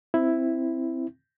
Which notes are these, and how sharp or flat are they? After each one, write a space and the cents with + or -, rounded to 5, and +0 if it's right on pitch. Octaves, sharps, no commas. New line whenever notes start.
C4 +0 E4 +0